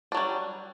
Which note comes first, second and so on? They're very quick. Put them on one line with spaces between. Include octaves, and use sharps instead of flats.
D4 F#3 G3